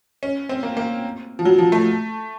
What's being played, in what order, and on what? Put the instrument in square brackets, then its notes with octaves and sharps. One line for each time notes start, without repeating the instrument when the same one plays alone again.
[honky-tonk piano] C#4
C4
A#3
A#3
F3
F#3
F3
A3